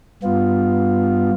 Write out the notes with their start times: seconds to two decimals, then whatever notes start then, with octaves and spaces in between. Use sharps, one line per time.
0.23 G2 B3 F4